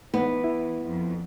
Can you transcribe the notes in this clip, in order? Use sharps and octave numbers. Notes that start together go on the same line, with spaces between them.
E3 B3 D#4
E4
F2